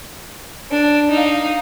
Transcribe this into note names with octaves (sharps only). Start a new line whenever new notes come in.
D4
D#4 F5